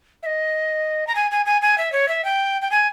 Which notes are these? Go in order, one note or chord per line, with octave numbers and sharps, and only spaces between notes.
E5
D#5
A#5
G#5
G#5
G#5
G#5
E5
C#5
E5
G5
G5
G#5